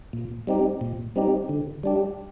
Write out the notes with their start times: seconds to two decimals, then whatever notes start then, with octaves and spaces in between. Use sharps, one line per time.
0.13 A#2
0.47 G3 C4 D#4 G4
0.81 A#2
1.16 G3 C4 D#4 G4
1.49 D3
1.83 G3 D4 G4